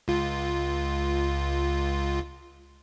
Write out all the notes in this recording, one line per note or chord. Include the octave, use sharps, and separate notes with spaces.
C#2 F4